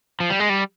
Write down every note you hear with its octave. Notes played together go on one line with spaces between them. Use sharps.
F3
G3
G#3
G3